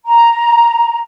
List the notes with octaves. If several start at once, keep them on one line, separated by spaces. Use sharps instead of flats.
A#5